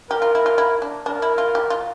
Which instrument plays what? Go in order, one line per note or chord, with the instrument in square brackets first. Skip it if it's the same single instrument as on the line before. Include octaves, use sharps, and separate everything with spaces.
[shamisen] G4 [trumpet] A#4
[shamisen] F4
E4
F4
E4
D4
[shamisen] D4 [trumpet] A#4
[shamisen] E4
F4
G4
F4